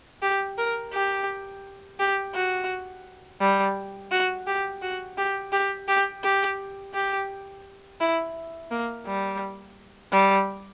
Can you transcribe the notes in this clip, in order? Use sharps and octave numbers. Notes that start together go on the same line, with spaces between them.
G4
A#4
G4
G4
F#4
G3
F#4
G4
F#4
G4
G4
G4
G4
G4
E4
A#3
G3
G3